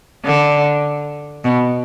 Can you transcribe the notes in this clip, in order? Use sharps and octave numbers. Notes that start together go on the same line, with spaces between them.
D3
B2